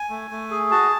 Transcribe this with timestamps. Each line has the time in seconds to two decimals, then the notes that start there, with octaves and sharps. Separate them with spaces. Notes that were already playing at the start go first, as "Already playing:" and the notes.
Already playing: G#5
0.10 A3
0.30 A3
0.51 G#4
0.71 F#4 A5